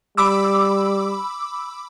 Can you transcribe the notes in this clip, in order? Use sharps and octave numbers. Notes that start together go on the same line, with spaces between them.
G3 B5 D6 E6